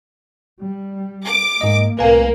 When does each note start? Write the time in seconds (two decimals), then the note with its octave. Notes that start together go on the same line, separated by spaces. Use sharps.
0.60 G3
1.25 D6
1.61 G#2 A#3 D#5
1.99 C2 A2 A#3 B4 G#5